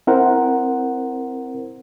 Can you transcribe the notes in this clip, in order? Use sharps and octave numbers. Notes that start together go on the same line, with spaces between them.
C4 E4 A#4 C5 F#5